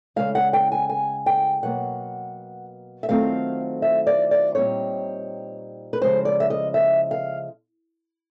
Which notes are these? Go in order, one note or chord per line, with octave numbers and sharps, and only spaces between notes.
C#3 F3 G#3 F5
F#5
G5
G#5
G#5
G5
B2 F#3 A#3 F#5
E5
D#3 F#3 A3 C4 F4 F5
E5
D5
D5
A#2 G3 C4 D#4 C#5
B4
C#3 F3 G#3 C5
D5
E5
D#5
E5
F5